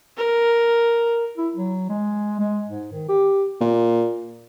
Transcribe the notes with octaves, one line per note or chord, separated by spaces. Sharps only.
A#4
E4
F#3
G#3
G#3
G#2
D#3
G4
A#2